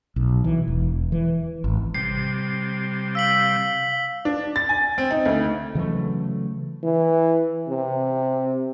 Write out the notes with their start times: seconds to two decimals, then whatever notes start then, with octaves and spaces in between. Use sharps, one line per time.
0.16 B1
0.44 E3
0.68 E1
1.12 E3
1.64 G#1
1.94 C3 G3 C7
3.15 F5 E6 B6 F#7
4.25 D4
4.56 A6
4.69 G#5
4.98 C4
5.11 D#4
5.25 D2
5.75 C#3 E3 F#3 A3
6.83 E3
7.69 C3